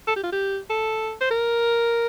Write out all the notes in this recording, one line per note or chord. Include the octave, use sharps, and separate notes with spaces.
A4
G4
F4
G4
A4
C5
A#4